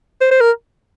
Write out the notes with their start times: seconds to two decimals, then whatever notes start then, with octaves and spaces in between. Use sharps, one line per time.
0.21 C5
0.31 C5
0.41 A#4